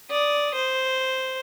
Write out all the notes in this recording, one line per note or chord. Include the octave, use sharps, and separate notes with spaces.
D5 D#6
C5